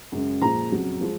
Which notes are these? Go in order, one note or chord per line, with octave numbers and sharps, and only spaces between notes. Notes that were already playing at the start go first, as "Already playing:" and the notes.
F#2 C#3 G#3
A#2 F3 G#3 A#5
F2 C#3 F#3
F3 G#3